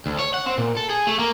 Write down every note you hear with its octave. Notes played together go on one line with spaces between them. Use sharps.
D2
C#5
F#5
C4
A#2
A4
G#4
A3
A#3